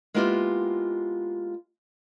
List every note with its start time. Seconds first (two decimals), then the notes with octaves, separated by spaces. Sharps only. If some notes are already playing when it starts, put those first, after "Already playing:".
0.14 G#3 A#3 B3 E4 F4 G4